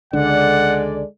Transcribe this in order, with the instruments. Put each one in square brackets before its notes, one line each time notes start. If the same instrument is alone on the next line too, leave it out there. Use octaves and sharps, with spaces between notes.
[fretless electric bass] C#2 D3 [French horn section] G#3 A4 D5 [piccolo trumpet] F#5